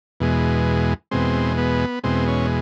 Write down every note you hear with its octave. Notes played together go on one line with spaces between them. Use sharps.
E2 B2 G#3
E2 B2 G#3 C4
B3
E2 B2 G#3 C4
C#4